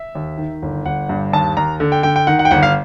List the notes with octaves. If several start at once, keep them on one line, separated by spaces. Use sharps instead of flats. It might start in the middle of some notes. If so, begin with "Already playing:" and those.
Already playing: E5
D#2
D#3
G1
G1 F#5
G2
D#2 A5
D#2 A#5
D3
G5
D3 G5
G5
D#3 F#5
F#5
G5
G1 F#5
F5